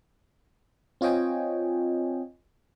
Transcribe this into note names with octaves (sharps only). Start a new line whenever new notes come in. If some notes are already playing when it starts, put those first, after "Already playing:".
C4 F4 C#5 D#5 G5 G#5